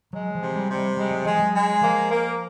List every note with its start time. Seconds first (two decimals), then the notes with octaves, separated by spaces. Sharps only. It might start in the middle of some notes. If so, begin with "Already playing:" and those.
0.13 F#3 G#3
0.35 F3
0.41 C3
0.56 G3
0.69 C3
0.77 G3
0.97 G3 G#3
1.11 F#3
1.25 F3 G#3
1.39 F#3
1.53 G#3
1.81 F3 A#3
2.10 A#3